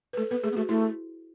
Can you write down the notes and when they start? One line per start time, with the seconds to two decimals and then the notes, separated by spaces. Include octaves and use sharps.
0.13 B4
0.17 A3 A4
0.30 B3 B4
0.43 A3 G#4
0.52 B3
0.56 A3 F#4
0.69 A3 E4